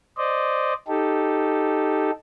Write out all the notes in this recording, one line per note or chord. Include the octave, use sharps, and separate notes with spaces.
C5 D5 D#5
D#4 G4 A4